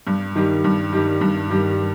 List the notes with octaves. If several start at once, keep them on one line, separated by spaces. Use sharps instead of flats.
G2
D#3 G3
G2
D#3 G3
G2
D#3 G3